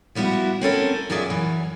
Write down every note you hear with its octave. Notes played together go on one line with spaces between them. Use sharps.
F3 G3 B3 E4 F#4
C4 C#4 A4 A#4
F#2 F#3 F4 G#4 D5 E5
F#2 E3